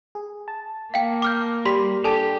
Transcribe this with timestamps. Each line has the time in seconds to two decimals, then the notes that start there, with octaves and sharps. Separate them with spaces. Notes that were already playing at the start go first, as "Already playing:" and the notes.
0.15 G#4
0.48 A5
0.94 A#3 F5 G5
1.22 D6 F6 G6
1.65 G3 B5 C6 B6
2.04 D4 G4 A4 G#5 A5